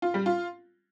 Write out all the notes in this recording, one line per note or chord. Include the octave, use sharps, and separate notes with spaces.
F4
G3
F4